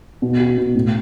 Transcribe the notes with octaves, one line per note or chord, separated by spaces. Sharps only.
B2
F#4
B2
A2